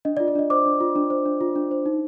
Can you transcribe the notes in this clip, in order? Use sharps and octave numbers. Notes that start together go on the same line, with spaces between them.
D4 D#5
D5
F4
D5
D4 D#5
C5 D6
D4
F4
D4
C5
D4
F4
D4
C5
D#4